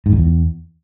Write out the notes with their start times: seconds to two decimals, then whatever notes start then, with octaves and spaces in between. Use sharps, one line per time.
0.06 G#2
0.12 F2
0.18 E2